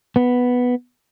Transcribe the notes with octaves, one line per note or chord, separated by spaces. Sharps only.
B3